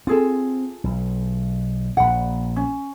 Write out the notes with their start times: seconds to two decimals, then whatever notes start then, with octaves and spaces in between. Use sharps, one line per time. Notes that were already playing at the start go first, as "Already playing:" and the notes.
0.07 C4 F4 G#4 A4
0.84 B1
1.97 A#1 A#2 F#5 B5
2.56 C#4